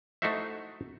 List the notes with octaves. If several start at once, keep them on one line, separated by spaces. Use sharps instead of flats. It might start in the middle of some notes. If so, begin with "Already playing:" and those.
A3 D#4 E4 F#4 C5 E5